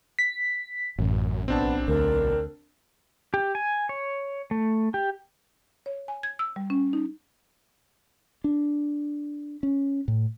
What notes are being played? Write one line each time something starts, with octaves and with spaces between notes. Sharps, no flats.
B6
A1 F#2
B1 B3 C4 D4 A5
D2 A#4
G4
G#5
C#5
A3
G4
C#5
G#5
G#6
E6
G3
C#4
D#4
D4
C#4
A2